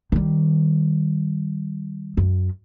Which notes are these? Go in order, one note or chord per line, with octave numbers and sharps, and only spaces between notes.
D#3 G3
F#2